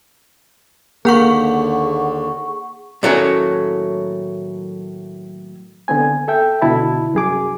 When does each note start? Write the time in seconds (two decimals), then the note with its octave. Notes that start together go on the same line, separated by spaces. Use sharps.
1.05 D#2 D3 A#3 G#4 F#5 C#6
3.03 A2 D#3 F#3 A3 A#3 C#4
5.88 D3 B3 C4 G#5
6.28 A4 E5 G5
6.62 C#2 B2 D3 E4 A5 B5
7.13 C2 F#2 G#4 D6